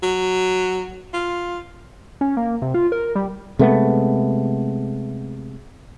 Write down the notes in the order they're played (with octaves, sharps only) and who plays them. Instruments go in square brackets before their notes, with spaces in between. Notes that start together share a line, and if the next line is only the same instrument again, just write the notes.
[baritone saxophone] F#3
F4
[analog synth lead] C#4
A#3
C3
F4
A#4
G3
[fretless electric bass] C3 G#3 A3 B3